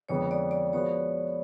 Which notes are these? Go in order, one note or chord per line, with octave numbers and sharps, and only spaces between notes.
F2 D3 G#3 B3 C#5
D5
D5
F3 G#3 B3 F#4 C#5